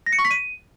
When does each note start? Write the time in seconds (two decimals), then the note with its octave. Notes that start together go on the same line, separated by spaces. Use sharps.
0.06 A#6
0.13 C#7
0.19 C#6
0.25 B6
0.31 D#7